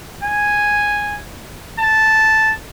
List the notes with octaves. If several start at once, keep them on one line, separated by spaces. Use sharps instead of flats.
G#5
A5